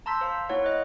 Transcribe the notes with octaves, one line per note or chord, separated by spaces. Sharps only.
A5 A#5 C6 E6 G6 B6
C5 F5
A#3 E4 C#5 F#5
D#5 F#6